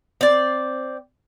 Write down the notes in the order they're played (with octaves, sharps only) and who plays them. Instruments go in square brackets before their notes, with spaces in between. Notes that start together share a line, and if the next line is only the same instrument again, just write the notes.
[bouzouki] C4 D5